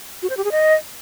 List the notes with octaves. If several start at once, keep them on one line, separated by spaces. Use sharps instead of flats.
F#4
C5
G4
G#4
D#5